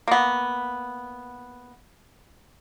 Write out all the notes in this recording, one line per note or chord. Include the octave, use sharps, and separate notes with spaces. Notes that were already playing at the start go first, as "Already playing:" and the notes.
A#3 B3